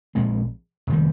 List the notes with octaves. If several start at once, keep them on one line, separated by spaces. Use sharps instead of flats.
A#1 A#2 G#3 C4
F1 D#3 G3